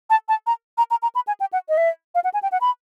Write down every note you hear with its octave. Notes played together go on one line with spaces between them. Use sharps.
A5
A5
A#5
A#5
A#5
A#5
B5
G#5
G5
F#5
D#5
E5
F5
F#5
G#5
G5
F#5
B5